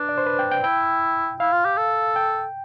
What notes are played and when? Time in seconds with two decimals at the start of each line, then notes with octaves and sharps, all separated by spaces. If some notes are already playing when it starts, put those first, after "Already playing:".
Already playing: D4 B4
0.09 D5
0.18 C5
0.26 B4
0.39 G5
0.51 G5
0.64 E4 G5
1.40 E4 F5
1.53 F4
1.65 G4
1.77 A4
2.16 G5